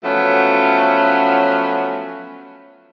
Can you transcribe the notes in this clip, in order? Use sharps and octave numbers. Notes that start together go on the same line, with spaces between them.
F3 F#3 A3 B3 C#4